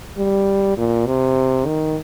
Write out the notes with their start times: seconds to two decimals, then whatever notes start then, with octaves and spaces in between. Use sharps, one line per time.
0.18 G3
0.77 A#2
1.07 C3
1.66 D#3